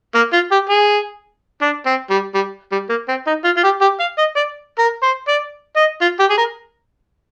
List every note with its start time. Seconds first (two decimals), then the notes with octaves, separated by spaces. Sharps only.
0.15 A#3
0.33 F4
0.52 G4
0.70 G#4
1.62 D4
1.86 C4
2.10 G3
2.35 G3
2.72 G3
2.89 A#3
3.09 C4
3.27 D#4
3.44 F4
3.57 F4
3.64 G4
3.81 G4
4.00 F5
4.18 D#5
4.36 D5
4.79 A#4
5.03 C5
5.28 D5
5.77 D#5
6.01 F4
6.20 G4
6.30 G#4
6.38 A#4